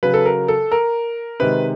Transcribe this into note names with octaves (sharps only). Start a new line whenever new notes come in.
C#3 F#3 B4
A4
A#4
A4
A#4
C3 D#3 G#3 B4